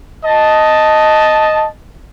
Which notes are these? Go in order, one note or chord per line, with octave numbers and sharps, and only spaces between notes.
D#5 A5